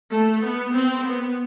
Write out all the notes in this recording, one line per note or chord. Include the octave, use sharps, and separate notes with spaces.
A3
B3
C4
B3